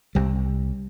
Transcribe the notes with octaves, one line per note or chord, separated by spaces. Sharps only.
C2 C3 G3